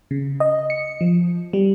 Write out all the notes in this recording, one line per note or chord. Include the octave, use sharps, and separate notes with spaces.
C#3
D#5
C#7
F3
G3